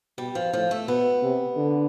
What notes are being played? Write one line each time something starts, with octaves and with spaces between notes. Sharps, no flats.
B2 G3
F3
A2 F3
A3
B2 B3
C3
D3